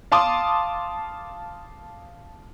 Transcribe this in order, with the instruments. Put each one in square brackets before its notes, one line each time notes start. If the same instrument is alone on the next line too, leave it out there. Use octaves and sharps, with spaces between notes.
[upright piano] F5 A5 C6 D6 D#6